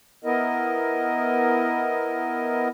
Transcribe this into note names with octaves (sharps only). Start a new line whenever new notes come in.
B3 E4 A#4 D#5